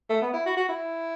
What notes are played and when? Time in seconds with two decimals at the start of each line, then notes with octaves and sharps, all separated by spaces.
0.10 A3
0.22 B3
0.33 E4
0.46 F#4
0.57 F#4
0.69 E4